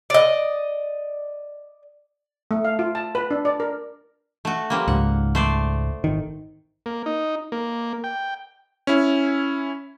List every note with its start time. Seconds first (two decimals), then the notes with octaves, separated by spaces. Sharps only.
0.10 D5 D#5
2.51 A3
2.65 F5
2.79 F4
2.95 A5
3.15 B4
3.31 D4
3.45 D5
3.60 A#4
4.45 A3 F#4
4.70 F3 G3 A#3
4.88 C#2 G#2 F#5
5.35 A3 C5 D5
6.04 G#1 D#3
6.86 A#3
7.06 D#4
7.52 A#3
8.04 G5
8.87 C#4 E4